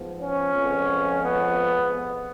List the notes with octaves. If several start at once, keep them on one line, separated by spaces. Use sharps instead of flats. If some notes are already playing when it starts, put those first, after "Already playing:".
Already playing: G#2 F3 B3
C#4
F2 F3 G#3 B3
B3